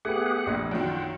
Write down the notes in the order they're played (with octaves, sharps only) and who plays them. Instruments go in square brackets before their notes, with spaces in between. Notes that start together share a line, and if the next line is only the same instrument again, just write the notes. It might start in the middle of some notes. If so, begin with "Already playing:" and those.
[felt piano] A3 B3 [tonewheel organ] G4 G#4 F#5
[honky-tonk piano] F1 [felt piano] A#1
[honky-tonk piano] F#2 D#3 [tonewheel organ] F4 F#5 G5